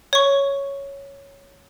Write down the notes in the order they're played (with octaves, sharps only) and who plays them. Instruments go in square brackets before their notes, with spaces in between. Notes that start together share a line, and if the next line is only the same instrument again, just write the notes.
[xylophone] C#5 C#6